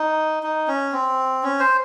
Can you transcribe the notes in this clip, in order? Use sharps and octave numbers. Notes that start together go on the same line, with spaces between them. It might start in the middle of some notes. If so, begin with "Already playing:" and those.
Already playing: D#4
D#4
C#4
C4
C#4
C5